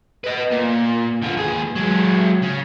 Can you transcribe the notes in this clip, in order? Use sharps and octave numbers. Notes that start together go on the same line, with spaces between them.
B4 D#5
A#2
D3 F4
D#2 G#4
F#3 G#3
C#3